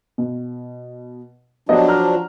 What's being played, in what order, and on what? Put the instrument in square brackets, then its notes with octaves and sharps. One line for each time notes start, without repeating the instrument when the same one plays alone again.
[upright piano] B2
[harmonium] F3 F#3 D4 [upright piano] B3 G4 D#5
[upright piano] A#5 F6